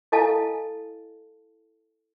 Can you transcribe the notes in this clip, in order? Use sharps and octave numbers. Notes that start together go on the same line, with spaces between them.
E4 A4 D#5 F5 G#5 A5